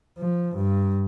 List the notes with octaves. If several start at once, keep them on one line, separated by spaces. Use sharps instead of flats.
F3
G2